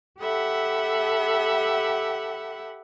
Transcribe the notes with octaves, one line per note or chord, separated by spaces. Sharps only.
G4 A4 E5 F#5 B5